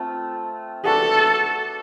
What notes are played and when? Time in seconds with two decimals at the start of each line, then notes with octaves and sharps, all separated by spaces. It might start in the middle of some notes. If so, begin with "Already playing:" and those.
Already playing: A3 C4 F4
0.85 A3 D4 F#4 A4 B4